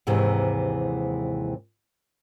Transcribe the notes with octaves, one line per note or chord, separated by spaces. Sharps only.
D#2 G#2 C3 E3